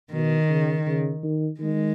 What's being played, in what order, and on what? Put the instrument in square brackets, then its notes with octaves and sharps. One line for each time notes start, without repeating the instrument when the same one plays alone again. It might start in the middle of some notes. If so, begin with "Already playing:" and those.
[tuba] B2 [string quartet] D#3
[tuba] C#3
C#3
D#3
[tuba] D#3 [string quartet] G#3